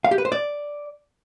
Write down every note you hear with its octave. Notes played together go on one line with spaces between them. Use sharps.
F5
G4
B4
C5
D5